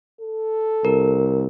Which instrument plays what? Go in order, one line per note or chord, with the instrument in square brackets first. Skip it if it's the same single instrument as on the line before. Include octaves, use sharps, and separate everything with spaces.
[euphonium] A4
[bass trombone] C2 [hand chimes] A#4